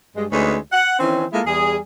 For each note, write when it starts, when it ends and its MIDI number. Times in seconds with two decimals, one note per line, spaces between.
0.17 0.27 43
0.17 0.27 56
0.32 0.58 38
0.32 0.58 56
0.32 0.58 61
0.32 0.58 63
0.32 0.58 71
0.73 0.97 78
1.00 1.27 51
1.00 1.27 52
1.00 1.27 60
1.00 1.27 61
1.33 1.42 56
1.33 1.42 58
1.33 1.42 64
1.33 1.42 65
1.33 1.42 69
1.47 1.78 40
1.47 1.78 55
1.47 1.78 68